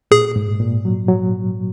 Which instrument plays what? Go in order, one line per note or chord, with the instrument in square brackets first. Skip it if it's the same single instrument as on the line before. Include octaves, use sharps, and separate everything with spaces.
[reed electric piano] A#2 [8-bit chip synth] G#4
[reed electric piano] G#2
A#2
F#3
F#3